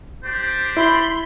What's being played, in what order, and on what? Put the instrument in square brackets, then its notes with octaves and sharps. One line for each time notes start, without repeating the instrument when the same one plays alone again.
[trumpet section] D4 G4 C5
[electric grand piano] E4 [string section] B5 C6